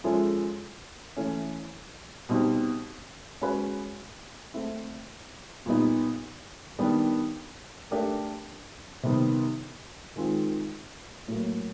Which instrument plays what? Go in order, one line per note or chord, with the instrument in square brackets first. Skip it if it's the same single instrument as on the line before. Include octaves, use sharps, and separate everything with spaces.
[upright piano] F3 G#3 C#4 E4 A4
E3 A3 C#4
B2 G3 C4 D#4 G4
G#3 C#4 F#4 B4
A3 C4 E4
A#2 G3 B3 D#4
D#3 G3 B3 D4 G4
A3 D4 G4 A#4
C3 D#3 G3 B3
D#3 G#3 C4 F4
A2 F#3 A#3